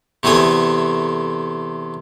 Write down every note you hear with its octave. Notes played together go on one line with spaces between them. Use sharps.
E2 C3 A3 A4 G#5 D#6